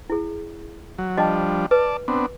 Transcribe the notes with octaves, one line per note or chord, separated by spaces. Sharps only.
E4 G#4
F#3
F3 G3 D4 D#5 G5 A5
B4 D5 A5
B3 C4 D4